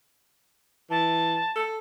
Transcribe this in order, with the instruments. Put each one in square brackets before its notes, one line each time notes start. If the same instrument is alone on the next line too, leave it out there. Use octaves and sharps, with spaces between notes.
[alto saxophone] E3 [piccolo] A5
[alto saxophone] A4